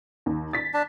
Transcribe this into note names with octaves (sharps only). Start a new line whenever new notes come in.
D#2
A6 B6
D4 A5